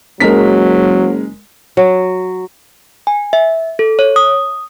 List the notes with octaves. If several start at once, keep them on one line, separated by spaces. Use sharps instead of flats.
F#1 F#3 G#3 A#4 B6
F#3
G#5
E5
A4
C#5
D#6